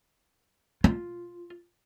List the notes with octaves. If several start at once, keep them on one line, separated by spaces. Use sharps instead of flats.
F4